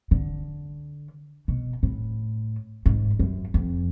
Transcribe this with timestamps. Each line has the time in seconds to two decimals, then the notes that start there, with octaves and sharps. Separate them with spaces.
0.11 D3
1.48 B2
1.83 A2
2.86 G#2
3.20 F#2
3.54 F2